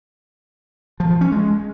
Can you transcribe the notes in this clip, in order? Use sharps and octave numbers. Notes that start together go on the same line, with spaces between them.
F3
F3
C#4
G#3